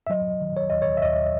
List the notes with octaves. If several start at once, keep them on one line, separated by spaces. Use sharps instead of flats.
E5
F#3 D#5
D#3
C#5
D#2 D#5
C#5
E5
D#2 D#5